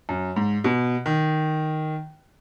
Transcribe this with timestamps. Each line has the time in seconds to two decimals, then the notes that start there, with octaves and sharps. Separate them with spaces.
0.09 F#2
0.36 G#2
0.64 B2
1.06 D#3